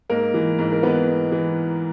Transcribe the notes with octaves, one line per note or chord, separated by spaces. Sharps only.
G#2 A#3 A#4
E3
G#2
A#4
E3 B3 B4
G#2
E3